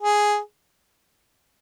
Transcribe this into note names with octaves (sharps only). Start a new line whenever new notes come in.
G#4